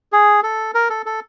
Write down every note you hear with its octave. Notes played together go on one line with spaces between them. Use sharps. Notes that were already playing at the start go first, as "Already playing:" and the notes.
G#4
A4
A#4
A4
A4